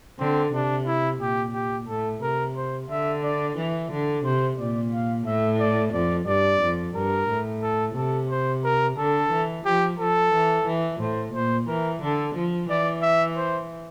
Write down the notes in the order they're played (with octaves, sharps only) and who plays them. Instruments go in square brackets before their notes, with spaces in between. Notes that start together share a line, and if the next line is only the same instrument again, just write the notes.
[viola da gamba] D3 [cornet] C4
[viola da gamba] C3 [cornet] D4
[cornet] E4
[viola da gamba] A#2 [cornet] G4
[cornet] G4
[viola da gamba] A2 [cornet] A4
[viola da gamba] C3 [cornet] A#4
[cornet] C5
[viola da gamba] D3 [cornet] E5
[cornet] D5
[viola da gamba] E3
D3
[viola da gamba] C3 [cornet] C5
[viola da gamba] A#2 [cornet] D5
[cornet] F5
[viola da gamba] A2 [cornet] E5
[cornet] D5
[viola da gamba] F2 [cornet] D5
[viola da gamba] G2 [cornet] D5
[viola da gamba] F2
[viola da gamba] G2 [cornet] A#4
[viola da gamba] A2
[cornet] A4
[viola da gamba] C3 [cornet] A4
[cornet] C5
A#4
[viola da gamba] D3 [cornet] A4
[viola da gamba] E3
[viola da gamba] F3 [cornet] G4
[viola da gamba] F3 [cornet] A4
[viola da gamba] E3
E3
[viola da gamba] A2 [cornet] C5
[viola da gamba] A#2 [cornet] C5
[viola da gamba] E3 [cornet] A#4
[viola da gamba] D3 [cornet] A4
[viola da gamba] F3
[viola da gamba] E3 [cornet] D5
[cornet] E5
C5